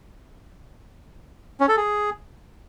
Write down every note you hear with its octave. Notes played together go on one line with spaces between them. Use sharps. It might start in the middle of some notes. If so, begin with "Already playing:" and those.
C#4
A4
G#4